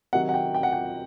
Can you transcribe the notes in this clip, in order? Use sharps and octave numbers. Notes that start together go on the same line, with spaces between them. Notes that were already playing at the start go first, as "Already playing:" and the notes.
C3 D#3 F#3 F#5
F#5
G5
G5
F#5
G5